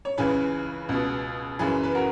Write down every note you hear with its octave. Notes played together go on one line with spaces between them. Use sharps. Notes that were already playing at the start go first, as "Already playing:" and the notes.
C#5
C#2 C#3 E3 G#4 B4
C#2 B2
F#2 C#3 E3 G#4 B4
B4
F#4 A#4